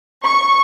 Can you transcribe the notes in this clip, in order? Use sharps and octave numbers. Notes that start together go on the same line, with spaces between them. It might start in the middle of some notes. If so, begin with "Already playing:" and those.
C#6